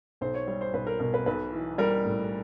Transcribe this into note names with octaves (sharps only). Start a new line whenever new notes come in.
B1 C5
C#5
G3 C#5
C5
B1 B4
A#4
B2 A#4
B4
B1 B4
E3
G3 A#4
A2